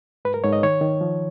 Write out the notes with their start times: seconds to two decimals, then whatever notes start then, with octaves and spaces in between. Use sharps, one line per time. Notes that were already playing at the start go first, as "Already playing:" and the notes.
0.25 G#2 B4
0.34 A#4
0.44 G#2 C#5
0.53 D#5
0.63 D#3 C#5
0.81 D#3
1.01 F3